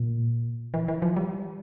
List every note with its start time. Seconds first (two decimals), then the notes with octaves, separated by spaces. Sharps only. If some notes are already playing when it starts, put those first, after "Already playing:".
Already playing: A#2
0.74 E3
0.88 E3
1.02 F3
1.16 G3